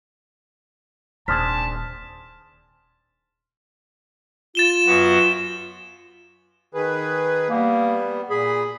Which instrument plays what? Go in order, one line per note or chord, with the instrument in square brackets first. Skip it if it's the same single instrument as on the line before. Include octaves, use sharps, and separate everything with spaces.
[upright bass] D#1 [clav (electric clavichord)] C4 D4 G#4 [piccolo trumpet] A5 [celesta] C6 F6 B6
[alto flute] F4 [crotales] A6 E7 G7
[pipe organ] F#2 B3 F#4
[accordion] D#3 G#4 B4
[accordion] G3 B3 [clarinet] A#3
[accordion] A#2 B5 [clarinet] G#4